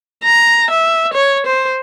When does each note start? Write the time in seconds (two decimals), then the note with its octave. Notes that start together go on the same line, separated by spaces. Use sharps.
0.24 A#5
0.70 E5
1.13 C#5
1.46 C5